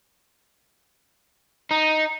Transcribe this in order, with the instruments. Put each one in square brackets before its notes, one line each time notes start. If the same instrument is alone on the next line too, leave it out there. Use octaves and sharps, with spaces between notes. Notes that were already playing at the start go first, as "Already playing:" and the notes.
[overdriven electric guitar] D#4